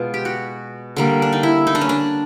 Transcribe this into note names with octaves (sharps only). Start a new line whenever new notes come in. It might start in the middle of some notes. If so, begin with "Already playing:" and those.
Already playing: B2 G#3 B3 F4
G4
F#4
D3 G3 A#3
D4
D#4
E4
D#4
D4
C#4
D4